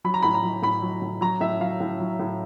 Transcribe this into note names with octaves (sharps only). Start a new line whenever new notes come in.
F#3 B5
A#5
A2 B5
A#5
F#3
A2 B5
F#3
A2
F#3 A#5
A2 E5
F#3 F5
A2
F#3
A2